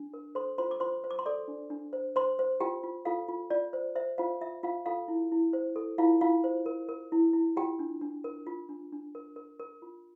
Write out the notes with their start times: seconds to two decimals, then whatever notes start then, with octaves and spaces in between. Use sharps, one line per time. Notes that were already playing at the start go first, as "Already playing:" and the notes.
Already playing: D4
0.14 A#4
0.35 A4 C5 C6
0.58 F4 C5 C6
0.71 D6
0.80 F4 C5 C6
1.04 C5
1.11 D6
1.19 C6
1.26 A4 D5 D6
1.48 D4
1.70 D4
1.93 C5
2.16 C5 C6
2.39 C5
2.60 F4 G4 G5
2.83 F4
3.05 F4 A4 F5
3.28 F4
3.50 F4 D5
3.73 C5
3.96 C5 E5
4.18 F4 C5 F5
4.41 F4 E5
4.63 F4 F5
4.86 F4 A4 F5
5.08 E4
5.32 E4
5.53 C5
5.76 A4
5.98 E4 F4 F5
6.21 E4 F4 F5
6.44 C5
6.66 A#4
6.89 A#4
7.12 E4
7.33 E4
7.57 F4 G4 G5
7.79 D4
8.01 D4
8.24 A#4
8.47 F4
8.69 D4
8.92 D4
9.15 A#4
9.36 A#4
9.59 A#4
9.82 F4